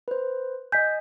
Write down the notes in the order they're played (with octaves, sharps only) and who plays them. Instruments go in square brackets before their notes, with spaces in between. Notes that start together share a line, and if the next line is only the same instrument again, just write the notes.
[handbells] B4 C5
[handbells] D#5 G#5 [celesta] G6 B6